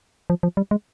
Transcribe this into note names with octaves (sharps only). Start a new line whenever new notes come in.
F3
F3
G3
G#3